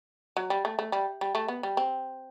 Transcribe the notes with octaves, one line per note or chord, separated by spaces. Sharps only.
F#3
G3
A3
A3
G3
G3
A3
B3
G3
C4